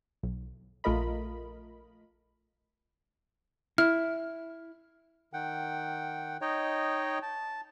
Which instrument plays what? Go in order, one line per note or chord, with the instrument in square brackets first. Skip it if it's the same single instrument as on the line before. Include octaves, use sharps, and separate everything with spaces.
[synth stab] B1
A#1 A3 F4 A#4 D#5 B5
[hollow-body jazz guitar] E4 [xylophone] F6
[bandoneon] D#3 F#5 G5
D#4 C#5 D#5 G5
A5